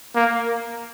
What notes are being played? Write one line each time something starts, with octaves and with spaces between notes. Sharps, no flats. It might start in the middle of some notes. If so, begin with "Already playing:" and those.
A#3